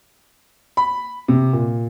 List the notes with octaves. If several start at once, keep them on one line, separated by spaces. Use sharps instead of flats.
B5
C3
A#2